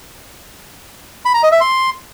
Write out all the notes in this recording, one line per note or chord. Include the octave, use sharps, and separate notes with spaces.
B5
A#5
D#5
E5
C6